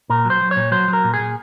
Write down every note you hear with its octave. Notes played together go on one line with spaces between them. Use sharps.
A#2 A#4
F#3
C5
F#3
C#5
A#2
F#3 C5
F#3
A#4
A#2
G#4
A#2